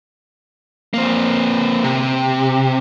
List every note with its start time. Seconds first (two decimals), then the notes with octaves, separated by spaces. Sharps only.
0.94 A#3 C4
1.84 C3